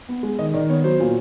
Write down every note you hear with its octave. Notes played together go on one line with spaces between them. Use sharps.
B3
G#3
D#3 D#5
D#3 D5
B3 C#5
F#3 C5
A#2